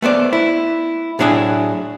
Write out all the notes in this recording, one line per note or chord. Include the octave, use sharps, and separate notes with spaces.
A3 B3 C5 D5
E4
A2 F#3 D4 E4 G#4